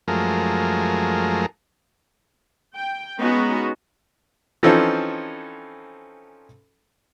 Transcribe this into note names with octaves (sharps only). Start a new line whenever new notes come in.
F#2 F3 G#3 A3 A#4
G5
G#3 B3 C#4 D#4 F#4
E3 F3 C4 C#4 D#4 A4